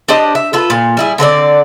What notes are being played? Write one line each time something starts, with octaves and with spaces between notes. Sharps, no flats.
D4 G4 C5 D#5
E5
F4 A4 B4
A#2
G3 E4 G#4
D3 C4 B4 D5